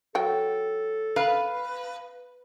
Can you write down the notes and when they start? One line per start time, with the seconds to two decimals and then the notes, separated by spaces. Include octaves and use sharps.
0.15 F#3 A4 G5
1.16 B4 F5